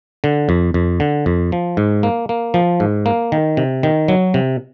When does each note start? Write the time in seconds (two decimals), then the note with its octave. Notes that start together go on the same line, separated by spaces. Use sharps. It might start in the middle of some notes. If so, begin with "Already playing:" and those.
0.24 D3
0.49 F2
0.74 F2
1.00 D3
1.26 F2
1.52 F3
1.77 G#2
2.03 A#3
2.29 A#3
2.54 F3
2.80 G#2
3.06 A#3
3.32 D#3
3.57 C3
3.83 D#3
4.08 F#3
4.34 C3